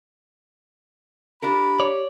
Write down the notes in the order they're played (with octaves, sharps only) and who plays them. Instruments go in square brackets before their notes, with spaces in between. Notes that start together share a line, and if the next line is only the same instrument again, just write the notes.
[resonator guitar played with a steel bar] D4 F4 A#4 [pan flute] G4 [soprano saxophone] B5
[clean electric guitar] C#5 D5